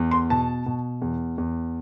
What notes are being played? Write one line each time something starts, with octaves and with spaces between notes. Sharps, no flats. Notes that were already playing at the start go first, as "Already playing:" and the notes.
Already playing: E2
C6
B2 A5
B2
E2
E2